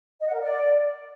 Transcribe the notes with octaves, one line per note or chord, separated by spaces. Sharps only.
D#5
F#5
A#4
D5